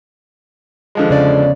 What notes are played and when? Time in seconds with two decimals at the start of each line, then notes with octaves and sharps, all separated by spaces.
0.95 D3 F3 G#3
1.09 E2 C#3 D5